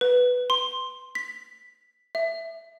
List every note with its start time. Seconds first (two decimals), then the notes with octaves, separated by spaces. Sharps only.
0.01 B4
0.50 C6
1.15 B6
2.15 E5